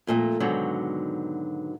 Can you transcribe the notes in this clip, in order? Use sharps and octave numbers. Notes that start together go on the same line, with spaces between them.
F2 A#2 G#3 A3
G#2 B2 D3 D#3 F#3